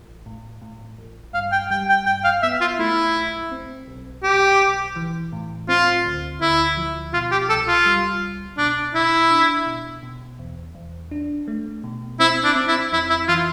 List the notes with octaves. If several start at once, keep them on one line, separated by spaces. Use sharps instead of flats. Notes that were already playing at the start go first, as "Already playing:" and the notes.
Already playing: A1
A2
A2
A1
G2 F5
G5
G3 G5
G5
G2 G5
F5
B3 E5
F4
A3 E4
B1
C4
B1
B1 G4
B1
E3
A2
C4 F4
D2
D2 E4
F3
B2 F4
G4
C2 A4
F4
G3
C2
B2 D4
B2 E4
D4
B2
B2
E2
E2
D4
A3
B2
C4 E4
D4
C4
E4
F2 E4
E4
E3 F4